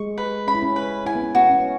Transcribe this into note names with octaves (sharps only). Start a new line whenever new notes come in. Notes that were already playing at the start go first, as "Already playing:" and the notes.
Already playing: G#3 C#6
B4
C#4 B5
E4
C#4
B4
E4 G#5
B3
C#4
B3 F#4
C#4
B3